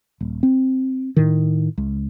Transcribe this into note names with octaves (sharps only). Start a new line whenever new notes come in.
D#1
C4
A2 D#3
C#2